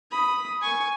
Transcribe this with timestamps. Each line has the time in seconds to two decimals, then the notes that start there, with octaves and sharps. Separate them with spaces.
0.11 B5 D#6
0.61 G#5 C#6